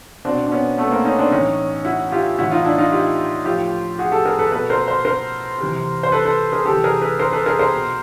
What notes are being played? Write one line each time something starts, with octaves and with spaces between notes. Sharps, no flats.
B2 C4 D4
D4
B3 C#4
A3 B3
A#3 C4
C#4 D#4
C4 D4
A2 E3 C#4 D#4
E4 F#4
F4 G4
A2 E3 E4 F#4
D#4 F4
D4 E4
D#4 F4
F4 G4
A2 F3 F4 G4
F#4 G#4
G4 A4
G#4 A#4
A4 B4
B2 A4 B4
A#4 C5
C5
A#4 C5
C3 E3
C5
A4 B4
A4 B4
G#4 A#4
C3 E3 G4 A4
G#4 A#4
A4 B4
A#4 C5
A4 B4
G#4 A#4
A#4 C5
B2